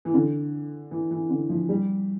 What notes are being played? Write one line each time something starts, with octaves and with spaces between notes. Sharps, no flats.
E3
D3
E3
E3
D3
F3
G3